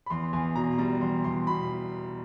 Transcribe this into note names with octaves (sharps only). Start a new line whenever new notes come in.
B5
E2 C6
E2 G#5
B2 A#5
G3 A#5
E2 C6
E2 C6
B2 B5